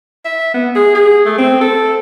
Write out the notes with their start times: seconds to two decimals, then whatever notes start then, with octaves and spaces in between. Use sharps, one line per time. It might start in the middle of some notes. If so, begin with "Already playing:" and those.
0.25 E5
0.54 B3
0.75 G#4
0.95 G#4
1.26 A3
1.38 C4
1.61 A4